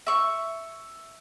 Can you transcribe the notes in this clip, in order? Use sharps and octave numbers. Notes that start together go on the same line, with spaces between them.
E5 C#6